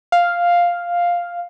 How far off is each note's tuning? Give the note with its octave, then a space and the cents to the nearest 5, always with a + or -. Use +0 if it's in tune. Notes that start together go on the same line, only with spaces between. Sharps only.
F5 +0